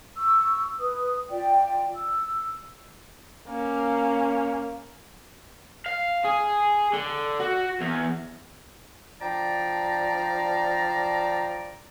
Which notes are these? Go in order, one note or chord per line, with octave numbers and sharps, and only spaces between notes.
C#6 E6
B4 D#6
F4 D5 G5
E6
A#3 C#4
F5
G#4
D3
F#4
E2
F3 D4 D5 G5 A5 A#5